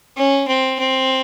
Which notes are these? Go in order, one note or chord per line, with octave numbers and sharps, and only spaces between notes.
C#4
C4
C4